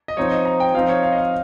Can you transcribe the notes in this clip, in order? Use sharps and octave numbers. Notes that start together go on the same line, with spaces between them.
D#5
F3 C4 D#4 C#5
D#5
A#5
G5
F3 C4 D#4 F5
C#5
F5
D#5
F5